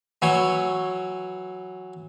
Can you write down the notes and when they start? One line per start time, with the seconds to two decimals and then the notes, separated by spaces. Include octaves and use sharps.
0.22 E3 F#3 C#5